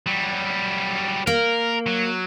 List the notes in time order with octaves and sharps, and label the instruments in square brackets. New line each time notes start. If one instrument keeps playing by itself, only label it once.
[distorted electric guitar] F#3 G3
[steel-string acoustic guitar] A#3 [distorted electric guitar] A#4
[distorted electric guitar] F#3